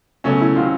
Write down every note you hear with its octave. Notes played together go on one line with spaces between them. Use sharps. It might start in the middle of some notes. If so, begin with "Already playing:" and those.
C#2 B2 F#3 A3 C#4
E4
C3 D#3 F#3 F4